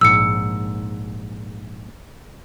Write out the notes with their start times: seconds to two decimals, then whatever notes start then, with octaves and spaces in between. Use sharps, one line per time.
0.01 A#1 G#2 E6 C#7